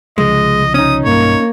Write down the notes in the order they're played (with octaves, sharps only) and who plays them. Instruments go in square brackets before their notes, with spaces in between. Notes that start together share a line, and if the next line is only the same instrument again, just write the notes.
[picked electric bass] C2 C#3 F3 [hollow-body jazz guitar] G#3 [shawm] D#5
[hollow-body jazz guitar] C#4 D#4 [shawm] D#6
[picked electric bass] B1 G2 [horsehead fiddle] A#3 [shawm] C#5